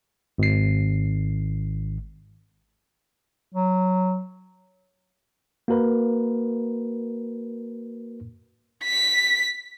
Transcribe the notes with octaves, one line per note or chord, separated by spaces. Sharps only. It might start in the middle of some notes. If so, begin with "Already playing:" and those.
G#1 C7
F#3
A#3 F#4 A#4 B4
B6